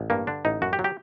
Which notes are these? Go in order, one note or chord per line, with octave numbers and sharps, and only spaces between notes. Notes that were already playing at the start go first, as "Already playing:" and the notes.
Already playing: A1
G2 A#3
D3 D4
A1 D#4
F#2 F#4
G4
F#3
G4